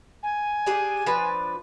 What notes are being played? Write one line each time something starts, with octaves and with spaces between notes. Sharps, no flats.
G#5
D4 G4 G#4
F3 D4 B4